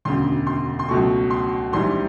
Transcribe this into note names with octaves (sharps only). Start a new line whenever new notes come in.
E1 D2 C#3 C6
C6
C6
C#2 B2 F#3 A3 C#6
C6
A#1 G#2 E3 G3 C6